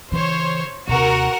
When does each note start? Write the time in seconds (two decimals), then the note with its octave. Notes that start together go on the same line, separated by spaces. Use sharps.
0.12 C#3 E3 C5 C#5
0.88 D#2 C3 F#4 A#4 F#5